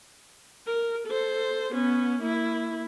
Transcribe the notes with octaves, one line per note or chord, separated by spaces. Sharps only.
A#4
A4 C5
B3 C#4
A#3 E4